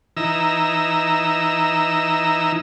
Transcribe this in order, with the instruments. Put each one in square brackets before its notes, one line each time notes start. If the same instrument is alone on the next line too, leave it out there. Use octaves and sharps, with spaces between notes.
[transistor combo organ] E3 D#4 A#5 E6